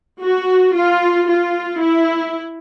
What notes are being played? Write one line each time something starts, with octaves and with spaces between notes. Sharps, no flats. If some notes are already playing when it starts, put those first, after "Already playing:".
F#4
F4
F4
E4